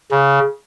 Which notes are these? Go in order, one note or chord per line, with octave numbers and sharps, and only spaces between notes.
C#3